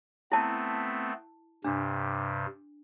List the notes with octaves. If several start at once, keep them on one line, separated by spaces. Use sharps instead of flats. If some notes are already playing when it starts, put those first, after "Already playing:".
A3 B3 C4 E4 A5
G2 C3 D4